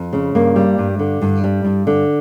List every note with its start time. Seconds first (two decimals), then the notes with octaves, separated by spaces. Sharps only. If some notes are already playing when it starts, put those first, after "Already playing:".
Already playing: F2
0.13 C#3
0.35 G2 A#3
0.56 G3
0.78 G2
0.99 D3
1.22 G2
1.44 G3
1.64 G2
1.87 D3